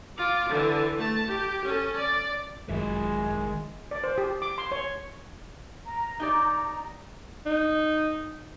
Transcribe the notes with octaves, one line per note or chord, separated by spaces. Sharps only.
F4 D6
D3 E3
A3 A5
G4
C#4 A4
D5
G#1 F#2 D#3 G#3 E5
D5
C5
G4
D6
C6
C#5
A#5
D#4 G4 D5
D#4